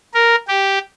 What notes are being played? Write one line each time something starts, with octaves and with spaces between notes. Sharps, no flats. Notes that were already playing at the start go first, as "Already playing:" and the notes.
A#4
G4